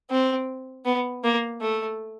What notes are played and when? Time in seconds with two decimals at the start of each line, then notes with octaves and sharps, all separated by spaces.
0.10 C4
0.85 B3
1.24 A#3
1.61 A3